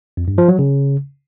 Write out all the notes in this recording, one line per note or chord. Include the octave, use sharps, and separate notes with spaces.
F2
G2
F3
F#3
C#3